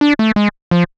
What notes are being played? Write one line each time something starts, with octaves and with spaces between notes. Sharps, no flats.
D4
A3
G#3
F3